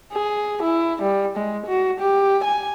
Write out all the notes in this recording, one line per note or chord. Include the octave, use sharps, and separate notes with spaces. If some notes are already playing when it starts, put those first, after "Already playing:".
G#4
E4
G3
G#3
F#4
G4
G#5